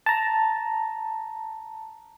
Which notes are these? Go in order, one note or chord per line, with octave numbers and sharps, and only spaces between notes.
A5 A#5